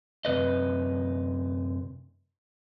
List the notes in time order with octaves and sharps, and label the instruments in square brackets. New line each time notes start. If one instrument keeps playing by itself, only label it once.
[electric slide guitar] F#2 C3 B4 D#5